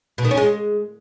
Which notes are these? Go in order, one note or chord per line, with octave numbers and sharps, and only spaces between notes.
B2
D#3
C#4
G#3